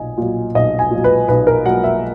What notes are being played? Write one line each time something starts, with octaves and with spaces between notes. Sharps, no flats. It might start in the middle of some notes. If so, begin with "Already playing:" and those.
Already playing: B1 A#2 D#5 G#5
A#2 F#3
B1 D#5
G#5
A#2 F#3
B4
B1 B4
A#4
A#2 F#3 F#5
E5